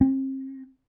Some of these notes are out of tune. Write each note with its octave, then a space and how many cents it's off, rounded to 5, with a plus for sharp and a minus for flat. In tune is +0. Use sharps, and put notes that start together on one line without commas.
C4 +40